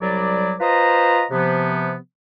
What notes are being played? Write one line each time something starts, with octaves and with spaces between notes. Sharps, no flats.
C2 F#3 G3 D5
F4 B4 C5 D#5 A#5
C3 F3 B3